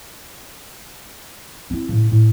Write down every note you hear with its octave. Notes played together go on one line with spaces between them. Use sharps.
C4 E4
A2 C#3
A2